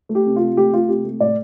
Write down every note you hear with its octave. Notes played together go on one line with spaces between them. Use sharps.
A3
G4
C3
C3 F4
A3 G4
A3 F4
C3 G4
A3
A2 D5